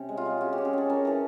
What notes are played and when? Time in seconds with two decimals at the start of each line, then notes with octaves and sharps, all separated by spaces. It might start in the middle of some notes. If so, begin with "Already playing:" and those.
Already playing: C3 C#4
0.09 G#3
0.17 F4
0.25 G#3
0.41 C#4 F#4
0.53 G4
0.58 C#4
0.65 G#4
0.73 C#4 A4
0.90 C#4 A#4
1.05 E3 A4